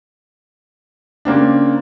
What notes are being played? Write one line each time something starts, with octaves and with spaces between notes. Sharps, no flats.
C#3 A#3 C4 D4